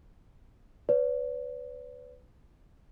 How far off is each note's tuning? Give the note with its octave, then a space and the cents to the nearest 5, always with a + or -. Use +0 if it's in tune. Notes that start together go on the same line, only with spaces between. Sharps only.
B4 +20 D5 -45